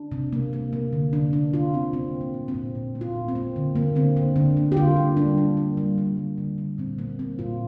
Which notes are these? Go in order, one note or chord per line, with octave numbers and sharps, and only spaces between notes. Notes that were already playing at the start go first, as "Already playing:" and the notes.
Already playing: D4
C3
A#3
A#3
A#3
D3
D3 D4
D3 D4
D3 F4
D3 C4
A#3 C4
A#2
A#3
A#3
C4
A#2
A#2
A#3
F4
A#2
C4
A#3
D3
D3 A#3
D3 C4
D3 C4
D3 D4
A#3
G4
D3 F4
A#3
G3 D4
A#3
A#3
G3
G3
D3
D3
D3
A#2 C4
A#3
A#3 C4
A#2 F4